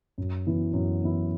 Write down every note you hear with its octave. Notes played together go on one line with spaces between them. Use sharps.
F#2
E3 B3 E4
F#2
E3 B3 E4